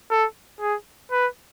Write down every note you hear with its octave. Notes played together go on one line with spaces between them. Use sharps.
A4
G#4
B4